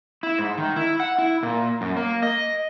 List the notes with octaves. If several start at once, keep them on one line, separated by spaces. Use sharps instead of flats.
E4
G#2
D#3
E4
F#5
E4
A#2
F#2
A#3
D#5